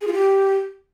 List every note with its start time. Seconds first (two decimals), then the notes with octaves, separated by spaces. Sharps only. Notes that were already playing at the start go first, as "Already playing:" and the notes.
0.01 G#4
0.07 F4
0.13 G4